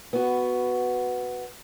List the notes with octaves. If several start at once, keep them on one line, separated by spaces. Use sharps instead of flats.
B3 F#4